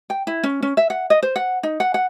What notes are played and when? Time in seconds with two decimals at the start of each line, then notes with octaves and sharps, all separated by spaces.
0.10 G5
0.27 E4
0.43 C#4
0.63 C#4
0.77 E5
0.90 F#5
1.10 D#5
1.23 C5
1.36 F#5
1.63 D#4
1.80 F#5
1.94 F#5